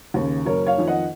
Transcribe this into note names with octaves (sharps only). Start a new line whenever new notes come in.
D#2 C#3
F#1 A#4 C#5
C#5 F5
F2 D#3
D#5 F#5